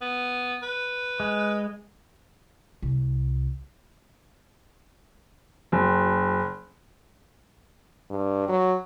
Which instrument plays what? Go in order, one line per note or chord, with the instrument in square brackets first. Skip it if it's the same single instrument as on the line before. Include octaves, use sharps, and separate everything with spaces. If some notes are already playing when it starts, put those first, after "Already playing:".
[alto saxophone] B3
B4
[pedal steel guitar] G#3
[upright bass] C2
[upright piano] F#1
[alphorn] G2
F#3